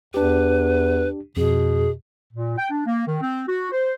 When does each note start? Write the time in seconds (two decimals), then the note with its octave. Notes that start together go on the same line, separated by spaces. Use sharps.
0.14 E2 D4 G4 B4
1.37 F2 B2 G#4
2.34 A#2
2.57 G5
2.69 D4
2.85 A#3
3.06 D#3
3.21 C4
3.47 F#4
3.71 C5